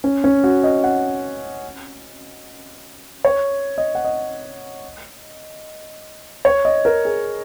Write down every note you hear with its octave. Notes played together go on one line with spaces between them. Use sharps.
C#4
C#4
F#4
D#5
F#5
C#5
D#5
F#5
D#5
C#5
D#5
A#4
G#4